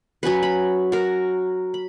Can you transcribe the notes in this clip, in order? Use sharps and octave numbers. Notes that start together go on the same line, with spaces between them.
F#3 C#4 F#4 B4
B5
F#4 A#4
B5